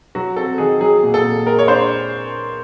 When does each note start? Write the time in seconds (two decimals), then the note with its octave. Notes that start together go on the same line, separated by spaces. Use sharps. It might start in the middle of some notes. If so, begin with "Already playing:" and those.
0.15 F#3 F#4
0.36 C4 A4
0.58 D#3 G#4
0.80 F#3 G#4
1.03 A#2
1.14 A4
1.24 A#2
1.46 G#3 A#4
1.59 C#5
1.68 D4 C5